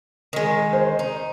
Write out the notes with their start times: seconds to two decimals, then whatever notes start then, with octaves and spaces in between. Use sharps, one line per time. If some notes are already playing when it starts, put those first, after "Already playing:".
0.33 D#3 G#3
0.73 C5
0.99 D#4